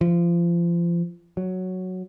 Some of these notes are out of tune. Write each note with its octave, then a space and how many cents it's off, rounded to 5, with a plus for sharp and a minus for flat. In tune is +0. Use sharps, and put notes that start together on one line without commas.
F3 -30
F#3 +0